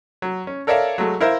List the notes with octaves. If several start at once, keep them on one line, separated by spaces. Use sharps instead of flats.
F#3
C#4
A4 A#4 C#5 D5 E5 F5
F#3 G#3 A3
E4 A#4 C5 E5 F5